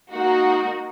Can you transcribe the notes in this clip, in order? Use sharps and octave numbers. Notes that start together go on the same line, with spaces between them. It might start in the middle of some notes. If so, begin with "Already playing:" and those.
A#3 D#4 F#4 A#4